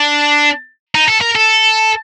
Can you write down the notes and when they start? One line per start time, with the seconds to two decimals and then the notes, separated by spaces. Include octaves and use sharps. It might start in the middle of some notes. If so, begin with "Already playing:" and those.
Already playing: D4
0.95 D#4
1.08 A4
1.21 A#4
1.35 A4